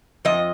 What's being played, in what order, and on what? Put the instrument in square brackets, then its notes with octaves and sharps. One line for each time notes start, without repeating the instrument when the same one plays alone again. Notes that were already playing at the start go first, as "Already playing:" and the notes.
[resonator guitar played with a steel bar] F2 F3 D#5